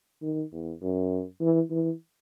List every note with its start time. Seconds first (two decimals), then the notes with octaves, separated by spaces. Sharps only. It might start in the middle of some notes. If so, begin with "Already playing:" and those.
0.22 D#3
0.52 E2
0.82 F#2
1.41 E3
1.71 E3